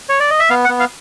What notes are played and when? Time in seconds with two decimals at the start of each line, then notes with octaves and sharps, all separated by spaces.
0.09 C#5
0.20 D5
0.30 D#5
0.40 E5
0.50 B3 F5
0.65 F#5
0.69 B3
0.80 F5